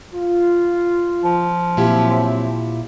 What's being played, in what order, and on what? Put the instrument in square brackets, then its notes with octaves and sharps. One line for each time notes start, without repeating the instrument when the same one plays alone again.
[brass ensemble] F4
[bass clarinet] F3
[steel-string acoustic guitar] A#2 E4 G4 [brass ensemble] F#3 C4 E5